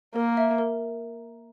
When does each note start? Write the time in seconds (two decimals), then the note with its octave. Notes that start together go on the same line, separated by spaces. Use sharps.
0.15 A#3 A#4
0.37 E5
0.58 A#4